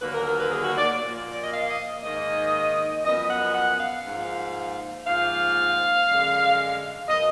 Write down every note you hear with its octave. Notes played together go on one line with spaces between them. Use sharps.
D#2 D3 F#3 A#3 B4
A#4
A#4
B4
G#4
F#4
D5
A#2 F3 A#3
D5
D#5
F5
D#5
G#2 D#3 A#3 D#5
F#2 F3 B3 D#5
F#5
F#5
F5
G#2 F3 A#3
G#2 F3 A#3 F5
F#2 D3 G#3
B2 F#3 A#3 D#5